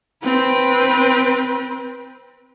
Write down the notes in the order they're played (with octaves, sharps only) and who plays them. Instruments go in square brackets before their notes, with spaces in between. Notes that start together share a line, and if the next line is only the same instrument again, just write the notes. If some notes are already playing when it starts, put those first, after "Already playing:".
[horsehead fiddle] C4 B4